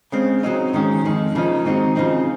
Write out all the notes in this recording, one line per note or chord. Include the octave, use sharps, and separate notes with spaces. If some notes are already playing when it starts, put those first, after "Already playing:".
C#3 G#3 C4
C#3 F#3 C4 D#4
G#2 D#3 G#3 C#4
F2 D#3 G#3
C#3 F3 A#3 D#4
G#2 D#3 F#3 C4 D#4
C#3 F3 C4 D#4